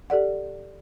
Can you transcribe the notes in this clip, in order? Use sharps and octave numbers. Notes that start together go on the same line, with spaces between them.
G4 A4 D5 F#5